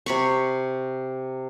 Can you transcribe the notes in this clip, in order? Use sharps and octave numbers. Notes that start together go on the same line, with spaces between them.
C3 B5 C#6